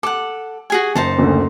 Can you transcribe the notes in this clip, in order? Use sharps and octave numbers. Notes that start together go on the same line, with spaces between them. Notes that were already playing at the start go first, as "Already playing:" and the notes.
A4 F#5 D6
F#4 G#4 G#5
F#1 D#4 C5 A5
F#1 D2